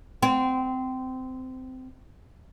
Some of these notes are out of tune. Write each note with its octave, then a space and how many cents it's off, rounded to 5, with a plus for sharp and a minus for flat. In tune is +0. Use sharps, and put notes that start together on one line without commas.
C4 -20